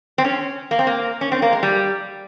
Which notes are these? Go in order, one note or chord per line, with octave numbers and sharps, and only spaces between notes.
C4
C#4
A#3
C4
A#3
C#4
C4
A#3
G#3
G3